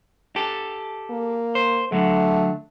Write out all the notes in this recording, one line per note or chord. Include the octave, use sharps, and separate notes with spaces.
G4 A4
A#3
C5
D3 F#3 A3